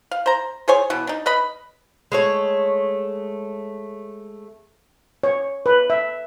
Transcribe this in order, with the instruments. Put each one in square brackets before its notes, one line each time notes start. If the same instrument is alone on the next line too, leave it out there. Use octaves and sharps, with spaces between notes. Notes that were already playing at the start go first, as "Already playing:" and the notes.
[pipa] F5
C5 A#5
G#4 C5 C#5 G#5
B2 E3
D4 D#4
B4 D#5 B5
[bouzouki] G#3 A3 C#5
[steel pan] C#5
B4
E5